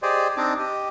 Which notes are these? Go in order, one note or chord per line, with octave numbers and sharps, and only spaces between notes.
G4 G#4 C5 D5 D#5
C4 D4 D#4 D6
G4 D#5